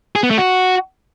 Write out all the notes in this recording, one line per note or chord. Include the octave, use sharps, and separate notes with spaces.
G#4
B3
A3
F#4